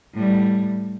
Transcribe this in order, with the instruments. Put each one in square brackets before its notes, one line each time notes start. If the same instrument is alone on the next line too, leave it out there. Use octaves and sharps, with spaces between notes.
[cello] A2 G3